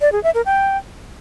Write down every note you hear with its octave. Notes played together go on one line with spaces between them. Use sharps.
D5
G#4
E5
A#4
G5